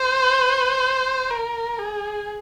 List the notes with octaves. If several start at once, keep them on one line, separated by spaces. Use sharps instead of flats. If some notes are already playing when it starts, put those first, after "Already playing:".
Already playing: C5
A#4
G#4